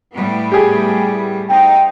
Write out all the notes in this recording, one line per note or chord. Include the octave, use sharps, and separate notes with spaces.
A2 G3 B3
G4 G#4
C4 D#4 G5